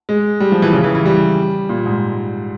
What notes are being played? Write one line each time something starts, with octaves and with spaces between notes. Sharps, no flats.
G#3
G3
F3
E3
C#3
E3
E3
G3
A#2
G#2